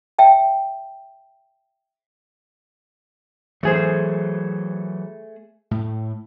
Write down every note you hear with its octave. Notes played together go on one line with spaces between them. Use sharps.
E5 G5 A5
E3 F#3 A3 G#4 C5
A2